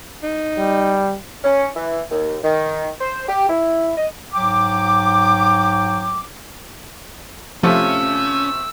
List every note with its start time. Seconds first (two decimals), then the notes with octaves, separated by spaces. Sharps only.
0.23 D#4
0.58 G3
1.44 C#4
1.76 E3
2.11 D#2
2.44 D#3
3.01 C5
3.29 G4
3.49 E4
3.97 D#5
4.34 G#2 F#3 G5 D6
7.63 C3 F3 A3 C#4 F4 E6